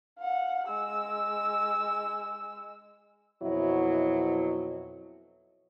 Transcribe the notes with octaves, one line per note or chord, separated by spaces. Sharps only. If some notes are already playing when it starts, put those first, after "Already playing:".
F5 F#5
G#3 E6
F2 B2 F#3 E4